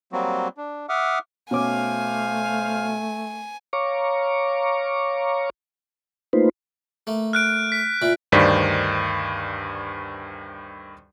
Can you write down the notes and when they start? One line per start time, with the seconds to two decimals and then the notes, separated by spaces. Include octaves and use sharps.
0.12 F#3 G3 A#3 C4 F#4
0.57 D4
0.89 E5 F#5 D6 D#6 F6
1.51 B2 A3 C#4 C5 F5 G#5 D6
3.73 C#5 F5 A#5 C#6 D6
6.33 A3 A#3 D#4 F4 B4 C5
7.07 A3 A#3
7.33 F6 F#6 D7
7.72 B6
8.02 A#2 E4
8.32 D2 G2 D#3 C5 D5 B6